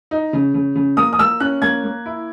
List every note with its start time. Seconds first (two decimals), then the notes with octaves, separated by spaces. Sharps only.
0.11 D#4
0.33 C#3
0.54 C#3
0.75 C#3
0.97 A#3 D#6
1.13 D#6
1.19 A#3 E6
1.40 C#4 F#6
1.62 A#3 G#6
1.84 A#3
2.06 E4